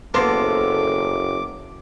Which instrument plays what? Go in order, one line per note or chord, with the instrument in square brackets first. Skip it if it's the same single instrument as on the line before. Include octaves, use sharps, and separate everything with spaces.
[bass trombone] F#1 [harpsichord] A#3 B3 [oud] A4 C5 [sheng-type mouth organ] D6